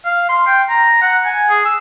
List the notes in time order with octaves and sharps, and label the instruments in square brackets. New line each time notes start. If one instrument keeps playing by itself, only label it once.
[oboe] F5
C6
G5
A#5
F#5
G#5
G#4
E6